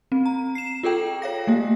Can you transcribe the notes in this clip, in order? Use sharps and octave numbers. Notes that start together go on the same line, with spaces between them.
C4
A#5
C7 E7
F4 G#4 A4 G5
C#5 F5 A#6
A3 A#3 G4